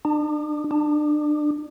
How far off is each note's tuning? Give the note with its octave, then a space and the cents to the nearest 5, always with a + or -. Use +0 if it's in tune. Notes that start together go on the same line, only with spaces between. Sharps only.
D4 +40
D4 +30